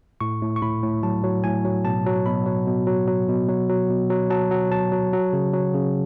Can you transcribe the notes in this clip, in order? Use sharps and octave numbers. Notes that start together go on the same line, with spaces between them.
A2 C#6
A2
C#6
A2 B5
A2
F#3 A5
F#3
A2 G#5
F#3
B2 A5
F#3
B2 B5
F#3
B2
F#3
F#3
B2
F#3
F#3
B2
F#3
F#3 A5
F#3
F#3 A5
F#3
F#3
C#3
F#3
C#3